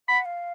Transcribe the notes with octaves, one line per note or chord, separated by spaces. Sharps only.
F#5 B5
F5